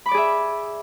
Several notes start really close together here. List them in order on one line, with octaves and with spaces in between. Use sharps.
B5 D6 D5 G#4 E5